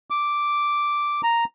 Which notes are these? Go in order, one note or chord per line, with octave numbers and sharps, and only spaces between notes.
D6
A#5